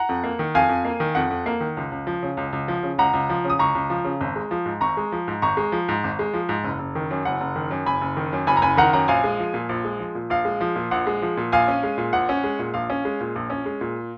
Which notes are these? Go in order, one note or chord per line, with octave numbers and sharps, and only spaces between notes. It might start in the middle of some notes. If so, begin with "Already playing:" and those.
Already playing: F#5 A#5
F2
A#3
D#3
F2 F5 G#5
F2
A#3
D#3
F2 F#5
F2
A#3
D#3
C#2
C#2
F3
C#3
C#2
C#2
F3
C#3
C#2 F#5 A#5
C#2
F3
C#3
D#6
C#2 A#5 C#6
C#2
F3
C#3
G#1
G#3
F3
G#2
G#1 A#5 C#6
G#3
F3
G#2
G#1 A#5 C#6
G#3
F3
G#2
G#1
G#3
F3
G#2
F#1
F#1
D#3
F#2
F#1 F#5
F#1
D#3
F#2
F#1 G#5 B5
F#1
D#3
F#2
F#1 G#5 B5
A#5
F#1 G#5 B5
D#3 F#5 A#5
F#2 F#5 A#5
A#1 F5 G#5
G#3
F3
A#2
A#1
G#3
F3
A#2
A#1 F5
G#3
F3
A#2
A#1 F#5
G#3
F3
A#2
A#1 F5 G#5
C#4
G#3
A#2
A#1 F#5
C#4
G#3
A#2
A#1 F5
C#4
G#3
A#2
A#1
C#4
G#3
A#2